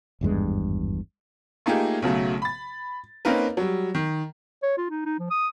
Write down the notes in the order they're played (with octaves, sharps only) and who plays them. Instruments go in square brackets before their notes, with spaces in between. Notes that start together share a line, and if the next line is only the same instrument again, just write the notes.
[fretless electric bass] G#1 E2 G2 G#3
[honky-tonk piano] A3 A#3 D#4 F4 G4 G#4
B1 C#3 F#3 A3
B5 A6
A#3 C4 C#4 D#4 A#4 B4
F#3 G3
D#3
[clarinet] C#5
F4
D#4
D#4
F3
D#6